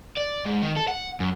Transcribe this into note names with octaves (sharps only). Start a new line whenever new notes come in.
D5
G#2
D#3
A4
F#5
F#2